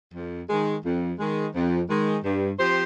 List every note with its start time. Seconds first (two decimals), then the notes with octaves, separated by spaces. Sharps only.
0.13 F2
0.48 D#3 G#3
0.84 F2
1.18 D#3 G#3
1.54 F2
1.89 D#3 G#3
2.24 G2
2.59 F3 C4 G4 C5